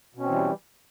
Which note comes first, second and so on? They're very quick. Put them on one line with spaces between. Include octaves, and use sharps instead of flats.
B2 C#4 C4 E3 G3